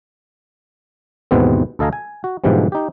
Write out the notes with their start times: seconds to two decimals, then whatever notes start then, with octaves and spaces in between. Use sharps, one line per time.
1.31 D#2 G#2 B2 E3 B3 C4
1.79 D2 A4 D#5 F5 G#5 A#5
1.93 G#5
2.24 F#4
2.44 G#2 B2 D3 E3 F3 G3
2.72 D#4 G4